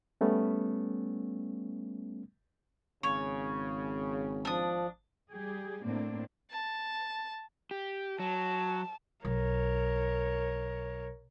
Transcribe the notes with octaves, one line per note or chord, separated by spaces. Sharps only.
G3 A3 B3 C#4
G#1 C#3 C#5
F3 D4 D#6
G3 G4 G#4
A2 A#3 C4 D4
A5
G4
F#3 A5
B1 A#4 C#5